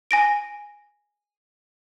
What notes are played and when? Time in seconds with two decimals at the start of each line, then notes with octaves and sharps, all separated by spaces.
0.11 G#5 A#6 D7